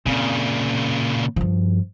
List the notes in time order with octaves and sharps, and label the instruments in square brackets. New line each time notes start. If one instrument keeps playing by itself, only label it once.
[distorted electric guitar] A#2 C#3 [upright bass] C4
[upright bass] G2 F3